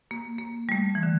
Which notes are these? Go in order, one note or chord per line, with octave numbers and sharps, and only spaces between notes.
A#3
A#3
G3
A3
E3
D3